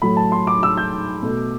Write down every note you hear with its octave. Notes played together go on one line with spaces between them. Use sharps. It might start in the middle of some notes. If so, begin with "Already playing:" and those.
A2 F#3 A3 B5
A5
C6
D6
E6
G6
B2 A3